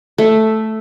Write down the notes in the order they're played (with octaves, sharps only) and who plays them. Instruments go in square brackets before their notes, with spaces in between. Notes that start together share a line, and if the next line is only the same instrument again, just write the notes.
[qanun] A3